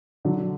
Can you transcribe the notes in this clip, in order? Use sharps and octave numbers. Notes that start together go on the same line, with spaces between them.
D3 F#3